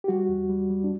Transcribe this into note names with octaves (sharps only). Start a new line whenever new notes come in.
G4
G3 F#4
E2
G3
G3
D4